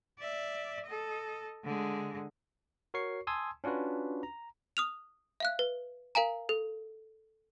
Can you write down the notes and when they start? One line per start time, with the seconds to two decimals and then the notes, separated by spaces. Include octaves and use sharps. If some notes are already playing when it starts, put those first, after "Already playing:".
0.19 D5 E5
0.86 A4 D#5
1.65 D3 G#3
2.94 F#4 A#4 C#5 C#6 C7
3.27 G#5 A5 C6 D#6 E6 G#6
3.64 C#4 D4 F4 F#4 B4
4.23 A#5
4.77 D#6 F6 F7
5.40 E5 F5 F#6
5.59 B4
6.15 A#4 F5 G#5 A#5
6.49 A4